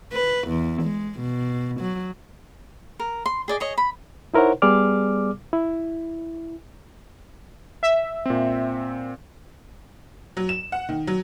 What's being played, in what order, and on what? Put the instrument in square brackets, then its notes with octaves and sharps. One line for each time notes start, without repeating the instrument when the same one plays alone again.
[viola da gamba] B4
E2
G#3
B2
F#3
[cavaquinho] A#4
C6
G#4 D5 D#5
G#4 C#5 D#5
B5
[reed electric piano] D#4 E4 A#4 C5 C#5 F#5
G3 B3 G#4 D5 D6 F6
E4
[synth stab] E5
[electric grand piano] A#2 C4
[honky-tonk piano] F#3
E7
F#5
D#3
F#3